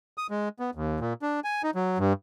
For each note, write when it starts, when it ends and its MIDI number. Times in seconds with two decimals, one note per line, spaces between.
0.18 0.27 87
0.31 0.49 56
0.60 0.70 59
0.75 1.00 39
1.00 1.13 46
1.22 1.40 62
1.44 1.62 80
1.63 1.71 63
1.75 1.98 54
1.99 2.13 43